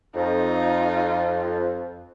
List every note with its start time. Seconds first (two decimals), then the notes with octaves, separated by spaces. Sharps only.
0.15 F2 D#4 F4